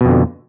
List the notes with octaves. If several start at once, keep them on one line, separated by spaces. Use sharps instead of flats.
F2 B2 D3